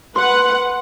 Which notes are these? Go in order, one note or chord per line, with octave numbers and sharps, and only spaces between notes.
B4 F#5 C6